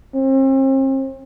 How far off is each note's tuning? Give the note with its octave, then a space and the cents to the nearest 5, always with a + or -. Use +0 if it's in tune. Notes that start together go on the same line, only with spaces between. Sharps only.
C4 +40